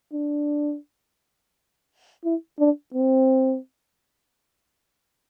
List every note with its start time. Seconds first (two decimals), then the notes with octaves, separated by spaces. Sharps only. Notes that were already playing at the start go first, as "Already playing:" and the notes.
0.13 D4
2.25 E4
2.59 D4
2.94 C4